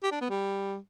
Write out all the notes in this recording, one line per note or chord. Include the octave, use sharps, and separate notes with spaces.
G4
D4
B3
G3